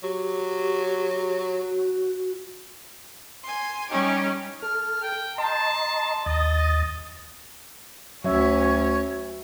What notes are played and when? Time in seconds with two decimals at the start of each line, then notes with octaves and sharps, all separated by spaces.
0.03 F#3 G4
1.28 F#4
3.43 G#5 C6
3.88 G3 C#4 D#4 G4
4.62 A4 F6
5.03 G5
5.38 D#5 A5 A#5 C6
6.26 D#2 D#5 D#6 A6
8.25 D2 F#3 C#4 C#5 E5